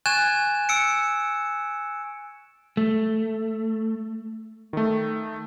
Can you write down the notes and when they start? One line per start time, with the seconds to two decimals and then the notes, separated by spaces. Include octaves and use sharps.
0.06 G#5 C#6 F#6 G#6 A6 E7
0.69 E6 C#7 D7
2.77 A3
4.73 D#3 A3